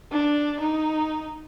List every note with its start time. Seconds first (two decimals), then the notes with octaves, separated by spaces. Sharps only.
0.12 D4
0.60 D#4